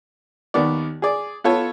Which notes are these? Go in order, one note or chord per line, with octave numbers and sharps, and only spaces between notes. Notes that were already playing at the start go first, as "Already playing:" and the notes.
D#2 D#3 B3 D5
G#4 D5
B3 F4 A4 C#5